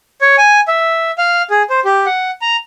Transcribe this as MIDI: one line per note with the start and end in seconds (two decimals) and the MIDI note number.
0.21 0.36 73
0.38 0.60 80
0.68 1.11 76
1.18 1.42 77
1.50 1.63 68
1.70 1.80 72
1.85 2.05 67
2.06 2.31 78
2.42 2.56 82